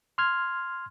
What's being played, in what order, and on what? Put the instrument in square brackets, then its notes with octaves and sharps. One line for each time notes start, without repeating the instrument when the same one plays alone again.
[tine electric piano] C6 F6 G#6